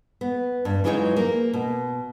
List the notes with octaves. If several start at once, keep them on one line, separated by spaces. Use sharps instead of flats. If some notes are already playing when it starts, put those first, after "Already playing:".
B3
G2
E3 F#3 G#3 D#4 F4 C#5
A#3
B2